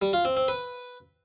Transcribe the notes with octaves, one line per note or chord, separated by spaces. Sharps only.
G3
F4
C4
C4
B4